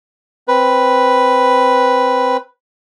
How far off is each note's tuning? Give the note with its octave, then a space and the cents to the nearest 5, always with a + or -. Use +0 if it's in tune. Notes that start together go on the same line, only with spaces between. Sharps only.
C4 +0 B4 +0